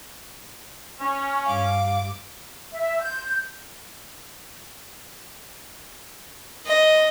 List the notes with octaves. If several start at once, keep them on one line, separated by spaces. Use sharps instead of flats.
C#4
G2 F5 D6
E5
G6
D#5